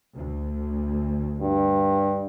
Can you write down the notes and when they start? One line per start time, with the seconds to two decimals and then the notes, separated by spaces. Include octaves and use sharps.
0.15 D2
1.41 G2